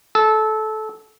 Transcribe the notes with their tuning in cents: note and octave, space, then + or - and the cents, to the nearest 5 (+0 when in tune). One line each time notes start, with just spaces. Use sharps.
A4 -20